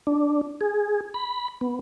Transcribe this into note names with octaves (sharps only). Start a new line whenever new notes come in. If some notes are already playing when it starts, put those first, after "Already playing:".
D4
G#4
B5
B3